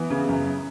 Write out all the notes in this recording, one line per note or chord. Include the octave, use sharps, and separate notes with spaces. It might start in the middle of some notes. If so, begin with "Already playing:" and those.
Already playing: E3 B3 E4
C#3
F#2